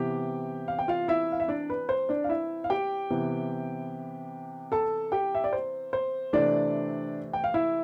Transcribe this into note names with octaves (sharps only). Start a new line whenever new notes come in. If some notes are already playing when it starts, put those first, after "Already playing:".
Already playing: C3 E3 B3 G4 G5
F5
G5
F4 F5
E4 E5
F5
E5
D4 D5
B4
C5
D4 D5
F5
E4 E5
F5
G4 G5
C3 E3 B3
A4 A5
G4 G5
E5
D5
C5
C5
C3 E3 A3 C4 D4 D5
G5
F5
E4 E5